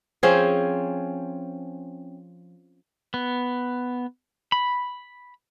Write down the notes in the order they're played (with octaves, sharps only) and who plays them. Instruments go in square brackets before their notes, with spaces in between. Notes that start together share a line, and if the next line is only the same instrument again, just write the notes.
[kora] F3 C4 C#4 G#4
[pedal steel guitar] B3
B5